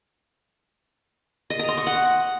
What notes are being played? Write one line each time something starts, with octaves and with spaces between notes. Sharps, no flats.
D#5
A#5
C6
C#6
F#5